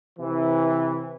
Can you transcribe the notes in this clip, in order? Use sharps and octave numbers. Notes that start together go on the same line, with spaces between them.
C3 E3